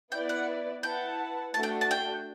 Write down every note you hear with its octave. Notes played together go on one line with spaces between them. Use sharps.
B3 E4 B4 D5 G5
F#5
E4 B4 F#5 G5 A5
A3 D4 F#4 A5
G5
A5
G5